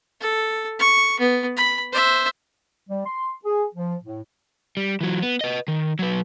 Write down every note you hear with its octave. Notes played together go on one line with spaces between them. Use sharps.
A4
C#6
B3
B5
C5 E5
G3
C6
G#4
F3
A2
G3
E3 F#3
B3
B4 D#5
D#3
F#3 B4